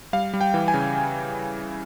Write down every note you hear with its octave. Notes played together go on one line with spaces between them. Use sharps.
G3 F5
G3
G5
E3
G#5
C#3